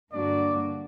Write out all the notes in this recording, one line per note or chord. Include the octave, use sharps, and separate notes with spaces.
G2 D3 A#3 D4 F#4 D5